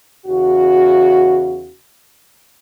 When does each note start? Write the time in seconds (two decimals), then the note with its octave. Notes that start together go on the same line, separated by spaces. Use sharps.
0.26 E2 C#3 F#4